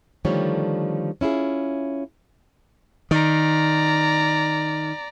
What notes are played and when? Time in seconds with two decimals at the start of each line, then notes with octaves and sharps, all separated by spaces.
0.25 D3 D#3 F3 G3 A3 C#5
1.21 C#4 E4 F4 G#4
3.11 D#3 D5 A#5